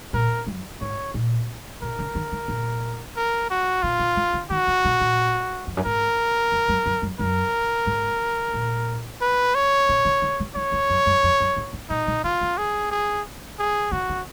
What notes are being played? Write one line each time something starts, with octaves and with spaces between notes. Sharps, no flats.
A#2 A#4
F#2
G#2 C#5
A#2
B2 A#4
C#3
D#3
C#3
A#2
A#4
F#4
B2 F4
B2
C#3
C#3
D#3 F#4
C#3
B2
A#2
F2
F#2
G#2 A#4
F2
F#2
F#2
F#2
F#2 A#4
G#2
A#2
B4
C#5
B2
C#3
C#3
C#3
D#3 C#5
C#3
F#2
F#2
F2
F#2
G#2
G#2
A#2 D#4
B2
C#3 F4
C#3
G#4
G#4
G#4
C#3 F#4
C#3